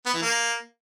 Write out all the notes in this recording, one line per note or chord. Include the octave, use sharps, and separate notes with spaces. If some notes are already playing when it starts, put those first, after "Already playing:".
B3
E3
A#3